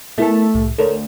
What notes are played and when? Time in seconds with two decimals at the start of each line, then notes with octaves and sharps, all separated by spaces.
0.18 A3 B3 E4 A4 A#4
0.54 C2 A2
0.78 D2 A4 A#4 C#5